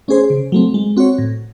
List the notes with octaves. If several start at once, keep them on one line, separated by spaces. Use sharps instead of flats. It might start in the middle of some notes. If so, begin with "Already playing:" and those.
A3 C#4 G#4 C5
C#3
F#3 A3 C4
G#3
C4 F#4 C#5
A2